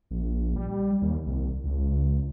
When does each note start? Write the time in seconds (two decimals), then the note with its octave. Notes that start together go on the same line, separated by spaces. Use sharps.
0.11 A#1
0.56 G3
1.02 D#2
1.27 C2
1.64 C#2